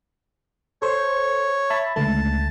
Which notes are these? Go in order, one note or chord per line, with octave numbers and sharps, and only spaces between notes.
A4 C5 C#5
E5 A5 B5
C#2 D3 A3 A5